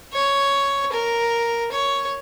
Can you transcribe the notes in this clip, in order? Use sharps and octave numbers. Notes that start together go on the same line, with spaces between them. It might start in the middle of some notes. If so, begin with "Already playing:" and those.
C#5
A#4
C#5